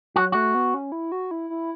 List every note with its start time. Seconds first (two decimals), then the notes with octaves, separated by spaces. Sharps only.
0.16 F#3 F#4
0.32 A3 F#4
0.55 B3
0.74 C#4
0.92 E4
1.12 F#4
1.31 E4
1.50 E4